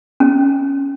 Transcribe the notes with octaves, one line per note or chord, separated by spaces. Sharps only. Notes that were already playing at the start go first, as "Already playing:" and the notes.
C#4